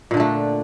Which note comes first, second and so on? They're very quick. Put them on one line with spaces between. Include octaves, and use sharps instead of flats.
A#2 D3 D4 A3